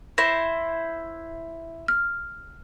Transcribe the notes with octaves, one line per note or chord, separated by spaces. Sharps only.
E4 C5 A#6
F6